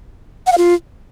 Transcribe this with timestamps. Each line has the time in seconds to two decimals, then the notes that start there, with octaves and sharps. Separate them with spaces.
0.47 F#5
0.52 F5
0.58 F4